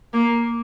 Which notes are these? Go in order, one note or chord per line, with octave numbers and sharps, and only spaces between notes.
A#3